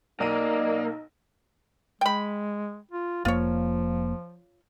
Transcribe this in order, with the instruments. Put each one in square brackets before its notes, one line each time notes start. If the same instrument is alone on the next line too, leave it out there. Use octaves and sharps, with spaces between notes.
[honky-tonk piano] B1 A#5 D#7 [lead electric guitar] A#3 [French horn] D#4 [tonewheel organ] D5 D#5
[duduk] G#3 [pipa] G5 B5
[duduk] F4
[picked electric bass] F1 F2 A#3 [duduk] F3 [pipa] F4 C#5